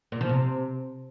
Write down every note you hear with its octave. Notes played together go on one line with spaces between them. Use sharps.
A#2
F3
C3